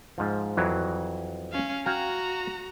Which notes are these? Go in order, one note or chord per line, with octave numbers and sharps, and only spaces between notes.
G#2 F3
F2 E3 F#3
C#4 F5
F#4 F5 G5 G#5 A#5